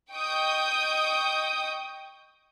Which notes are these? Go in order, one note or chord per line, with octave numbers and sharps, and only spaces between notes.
D#5 G5 C#6 D#6 G6